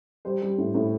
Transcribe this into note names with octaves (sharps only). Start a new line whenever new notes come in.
G3 C5
G3
A2
A2